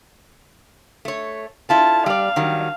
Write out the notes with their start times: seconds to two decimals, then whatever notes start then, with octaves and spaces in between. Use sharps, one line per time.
1.05 A3 C#5
1.69 E4 F4 A4 A5
2.06 G3 D5 F5
2.36 D#3 F#3 G3